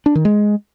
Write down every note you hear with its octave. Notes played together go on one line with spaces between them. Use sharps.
D4
D#3
G#3